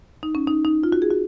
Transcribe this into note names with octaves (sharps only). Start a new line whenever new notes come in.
D#4
C#4
D#4
D#4
F4
F#4
G#4
F#4